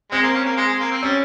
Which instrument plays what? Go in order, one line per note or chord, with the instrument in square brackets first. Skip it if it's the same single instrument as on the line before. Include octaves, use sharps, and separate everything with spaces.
[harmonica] G#3 [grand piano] C4
[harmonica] A#3
C#4
A#3
G#3
G#3
A#3
C4
[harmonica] G3 [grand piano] C#4